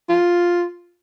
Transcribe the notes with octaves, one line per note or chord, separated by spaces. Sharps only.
F4